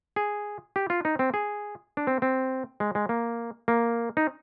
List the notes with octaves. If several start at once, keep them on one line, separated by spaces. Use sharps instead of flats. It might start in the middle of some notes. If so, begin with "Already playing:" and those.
G#4
G4
F4
D#4
C4
G#4
D4
C4
C4
G#3
G#3
A#3
A#3
D#4